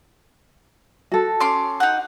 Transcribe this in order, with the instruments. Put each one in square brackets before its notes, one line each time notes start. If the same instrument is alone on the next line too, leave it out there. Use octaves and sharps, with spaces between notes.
[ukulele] F#4 A4
[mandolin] C#4 C6 D6
D#4 F#5